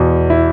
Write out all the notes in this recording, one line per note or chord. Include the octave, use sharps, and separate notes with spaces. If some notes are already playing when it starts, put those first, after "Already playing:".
Already playing: E2 B2
E4